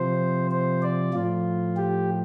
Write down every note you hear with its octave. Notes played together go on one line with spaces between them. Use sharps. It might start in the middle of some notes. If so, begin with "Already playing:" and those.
Already playing: C3 F3 C5
C5
D5
A2 F3 F4
G4